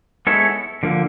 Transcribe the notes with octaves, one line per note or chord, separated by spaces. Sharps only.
G#3 B3 E4 A4 C#5
D3 F3 A#3